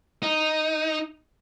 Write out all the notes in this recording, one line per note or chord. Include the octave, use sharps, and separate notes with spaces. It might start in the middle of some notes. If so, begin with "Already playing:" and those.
D#4